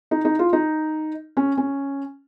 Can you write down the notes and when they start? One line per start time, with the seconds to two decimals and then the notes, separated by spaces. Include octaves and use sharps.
0.11 D#4
0.25 D#4
0.39 F4
0.53 D#4
1.37 C#4
1.57 C#4